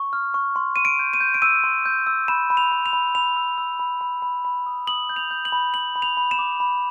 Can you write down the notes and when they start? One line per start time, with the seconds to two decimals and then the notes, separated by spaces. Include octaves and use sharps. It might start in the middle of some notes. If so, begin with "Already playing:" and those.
Already playing: C#6
0.13 F6
0.34 C#6
0.56 C6
0.76 C6 D#7
0.85 D7
0.99 G6
1.13 D#7
1.21 G6
1.34 D7
1.42 E6 D#7
1.64 C6
1.86 G6
2.07 E6
2.28 B5 E7
2.50 B5
2.57 F7
2.72 B5
2.86 F7
2.93 B5
3.15 B5 F7
3.36 E6
3.58 E6
3.79 B5
4.01 B5
4.22 B5
4.45 B5
4.66 D#6
4.87 D#6 F#7
5.09 G6
5.16 F7
5.31 G6
5.45 F#7
5.52 B5
5.74 B5 F#7
5.96 B5
6.02 F7
6.17 B5
6.31 E7
6.39 D6
6.60 B5